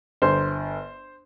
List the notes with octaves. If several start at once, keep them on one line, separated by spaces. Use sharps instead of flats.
G1 C5 C6